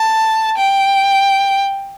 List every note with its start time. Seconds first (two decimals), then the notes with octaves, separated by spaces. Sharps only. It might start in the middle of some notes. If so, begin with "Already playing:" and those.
Already playing: A5
0.58 G5